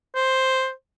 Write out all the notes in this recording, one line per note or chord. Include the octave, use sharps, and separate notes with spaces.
C5